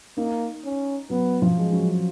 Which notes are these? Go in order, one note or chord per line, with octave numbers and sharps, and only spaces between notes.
A#3 D#4
C#4
F#3 B3
F3
G#3
F#3